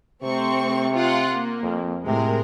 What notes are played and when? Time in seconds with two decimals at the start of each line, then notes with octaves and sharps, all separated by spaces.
0.23 C3 A3 C4 C#6
0.95 F4 F#5
1.31 A#3
1.63 F2
2.06 A2 C3 G#3 A#4